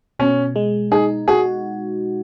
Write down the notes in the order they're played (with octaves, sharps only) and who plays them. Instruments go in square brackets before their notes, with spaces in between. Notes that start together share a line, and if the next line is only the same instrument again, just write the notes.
[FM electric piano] B2 [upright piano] C#4
[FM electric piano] G#3
[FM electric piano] D#4 [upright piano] G#4
[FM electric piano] F#4 [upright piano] G#4